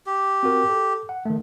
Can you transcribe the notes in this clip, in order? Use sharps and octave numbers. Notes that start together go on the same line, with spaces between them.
G4
C4 F#4 A#4
A4
F#5
D#3 A3